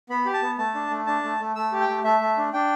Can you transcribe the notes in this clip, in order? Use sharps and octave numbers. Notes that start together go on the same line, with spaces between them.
B3 B5
G4
A5
B3
A3 A5
D4
A3
D4 A5
A3
A3
A3 E6
G4
G5
A3
A3 E5
A3
D4
D4 G5